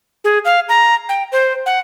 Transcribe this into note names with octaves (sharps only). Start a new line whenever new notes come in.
G#4
F5
A#5
G5
C5
F#5